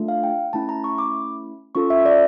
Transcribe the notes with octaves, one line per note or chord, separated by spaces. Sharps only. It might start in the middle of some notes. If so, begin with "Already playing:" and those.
Already playing: A3 D4 F4 A4
F5
G5
A3 C#4 E4 A5
A#5
C#6
D6
C#4 F4 A4 C#6
E5
D5